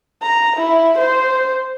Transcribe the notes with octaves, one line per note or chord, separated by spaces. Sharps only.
A#5
E4
C5